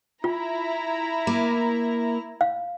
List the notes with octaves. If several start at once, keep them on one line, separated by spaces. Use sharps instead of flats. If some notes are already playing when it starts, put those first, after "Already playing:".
E4 F4 A#5
A#3
F5